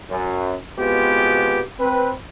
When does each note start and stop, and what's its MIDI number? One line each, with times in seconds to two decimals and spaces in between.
0.10 0.56 42
0.79 1.61 47
0.79 1.61 56
0.79 1.61 59
0.79 1.61 60
0.79 1.61 65
0.79 1.61 67
1.80 2.13 60
1.80 2.13 71